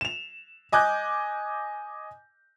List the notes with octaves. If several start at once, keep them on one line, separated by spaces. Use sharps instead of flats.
E7 F7
D#5 G#5 D6 F#6 G6